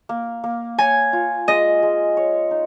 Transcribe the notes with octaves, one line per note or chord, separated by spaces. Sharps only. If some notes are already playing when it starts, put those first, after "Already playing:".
A#3
A#3
C#5 G#5
F4
G#3 D#5
G#3
C#5
D#4